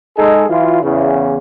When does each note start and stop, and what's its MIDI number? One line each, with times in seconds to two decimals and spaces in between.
0.17 0.45 56
0.17 0.45 63
0.17 0.45 68
0.17 0.45 69
0.49 0.81 52
0.49 0.81 54
0.49 0.81 65
0.82 1.38 40
0.82 1.38 49